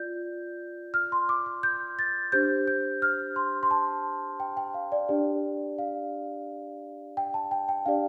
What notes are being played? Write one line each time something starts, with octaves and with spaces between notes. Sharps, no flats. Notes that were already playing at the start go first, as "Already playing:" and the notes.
Already playing: F4 D5 G6
F6
C6
D6
D6
G6
A6
D4 G4 C5 G6
G6
F6
C6
C6
A5
G5
G5
F5
D5
D4 G4 D5
F5
G5
A5
G5
G5
D4 G4 D5 F5